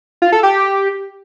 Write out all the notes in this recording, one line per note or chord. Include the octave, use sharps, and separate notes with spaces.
F4
A4
G4